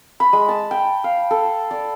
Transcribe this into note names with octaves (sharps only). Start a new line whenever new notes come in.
B5
G#3
A5
G5
F5
A4
D5